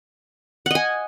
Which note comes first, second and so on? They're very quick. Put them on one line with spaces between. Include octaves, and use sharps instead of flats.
F#5 D#5 G#5